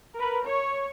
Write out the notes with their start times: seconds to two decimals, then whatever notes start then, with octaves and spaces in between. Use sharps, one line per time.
0.15 A#4 B4
0.46 C#5